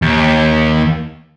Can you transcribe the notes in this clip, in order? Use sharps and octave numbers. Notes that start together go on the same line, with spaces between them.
D#2